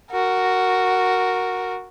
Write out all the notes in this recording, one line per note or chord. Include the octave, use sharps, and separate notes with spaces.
F#4 A#4